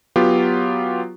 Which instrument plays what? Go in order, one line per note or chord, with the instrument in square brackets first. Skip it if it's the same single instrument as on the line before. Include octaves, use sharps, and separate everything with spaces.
[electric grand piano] F#3 B3 F4 G4